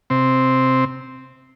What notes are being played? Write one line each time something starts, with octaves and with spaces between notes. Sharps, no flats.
C3 C4